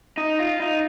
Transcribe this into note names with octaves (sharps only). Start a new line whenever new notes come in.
D#4
F4
D#4